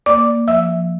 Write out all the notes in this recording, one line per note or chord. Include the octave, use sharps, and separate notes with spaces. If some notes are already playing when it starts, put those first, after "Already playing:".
A#3 D5 D6
A#3
F3 E5 E6
F3